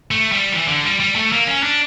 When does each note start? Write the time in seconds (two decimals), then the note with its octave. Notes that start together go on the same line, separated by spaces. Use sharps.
0.11 A3
0.32 G3
0.52 E3
0.68 D3
0.84 G3
1.00 G3
1.16 A3
1.32 A#3
1.47 C#4
1.63 D4